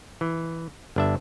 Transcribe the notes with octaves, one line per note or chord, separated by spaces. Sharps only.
E3
G1 D4 E5